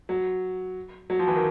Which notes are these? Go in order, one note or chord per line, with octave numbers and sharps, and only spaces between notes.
F#3
F#3
F3
E3
D#3